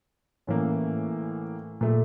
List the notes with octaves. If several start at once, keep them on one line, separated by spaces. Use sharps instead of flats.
A2 E3 A#3 C#4
A#2 A3